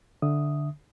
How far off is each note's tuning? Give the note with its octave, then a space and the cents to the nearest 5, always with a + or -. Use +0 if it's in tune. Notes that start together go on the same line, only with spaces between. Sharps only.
D3 +0 E5 +0 D#6 +0